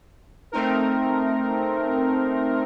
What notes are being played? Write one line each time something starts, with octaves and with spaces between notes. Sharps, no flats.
A3 C4 D#4 A#4